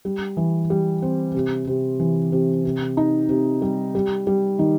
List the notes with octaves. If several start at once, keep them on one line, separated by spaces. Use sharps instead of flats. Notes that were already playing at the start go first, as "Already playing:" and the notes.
G3
E3
G3
C4
C3
C3
E3
C3
C3
D#4
C3
G3
G3
G3
D#3